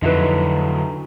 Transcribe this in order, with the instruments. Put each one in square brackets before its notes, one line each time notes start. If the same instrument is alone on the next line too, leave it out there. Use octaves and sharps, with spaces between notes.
[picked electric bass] F2 [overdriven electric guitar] D3 F#3 [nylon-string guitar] D#4 E4 B4